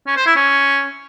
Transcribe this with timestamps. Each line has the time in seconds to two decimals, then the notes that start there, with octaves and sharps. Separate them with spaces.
0.07 C#4
0.17 C5
0.26 E4
0.36 C#4